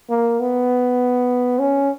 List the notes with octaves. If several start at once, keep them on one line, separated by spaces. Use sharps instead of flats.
A#3
B3
C#4